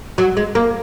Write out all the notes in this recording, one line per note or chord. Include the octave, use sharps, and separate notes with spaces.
F#3
G#3
A#3